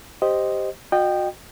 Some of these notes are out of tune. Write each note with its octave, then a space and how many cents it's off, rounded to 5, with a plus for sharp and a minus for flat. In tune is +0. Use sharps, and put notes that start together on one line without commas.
G4 +0 C5 +0 D#5 +0
F#4 -35 D#5 -30 G5 +0